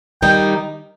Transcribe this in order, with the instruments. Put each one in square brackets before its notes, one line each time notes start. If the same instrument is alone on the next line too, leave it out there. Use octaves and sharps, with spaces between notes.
[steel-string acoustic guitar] D#3 G3 D#4 [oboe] G5